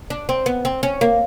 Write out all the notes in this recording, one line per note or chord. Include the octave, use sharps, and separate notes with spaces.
D4
C4
B3
C4
C#4
A#3